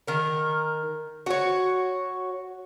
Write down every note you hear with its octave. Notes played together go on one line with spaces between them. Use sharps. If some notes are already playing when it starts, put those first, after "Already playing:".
D#3 A#4
F#4 C#5